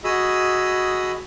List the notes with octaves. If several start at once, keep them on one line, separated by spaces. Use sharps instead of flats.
F#4 G#4 D#5 B5 D#6 E6